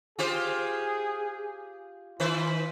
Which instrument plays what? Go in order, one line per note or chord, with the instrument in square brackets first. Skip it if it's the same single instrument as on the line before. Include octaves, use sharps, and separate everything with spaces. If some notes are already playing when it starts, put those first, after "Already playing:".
[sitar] F4 G4 C5 [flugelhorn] G#4
[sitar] D#3 B4 C5 [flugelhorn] F4